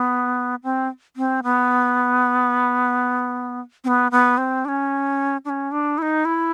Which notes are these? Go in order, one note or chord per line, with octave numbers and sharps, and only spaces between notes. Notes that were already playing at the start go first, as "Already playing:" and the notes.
Already playing: B3
C4
C4
B3
C4
B3
B3
C4
D4
C#4
D4
C#4
D4
E4
D#4
E4